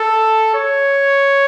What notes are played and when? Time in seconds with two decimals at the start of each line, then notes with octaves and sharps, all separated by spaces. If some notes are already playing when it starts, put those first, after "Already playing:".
Already playing: A4
0.55 C#5